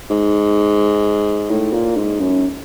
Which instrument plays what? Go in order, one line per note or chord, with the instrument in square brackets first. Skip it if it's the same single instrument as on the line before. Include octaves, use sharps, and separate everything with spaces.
[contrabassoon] G#2
A2
A#2
G#2
F#2